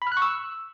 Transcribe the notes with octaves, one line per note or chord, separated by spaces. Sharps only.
B5
F6
F#6
C#6
E6